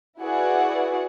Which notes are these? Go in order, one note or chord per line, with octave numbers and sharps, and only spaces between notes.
E4 F#4 G#4 B4 D5 F#5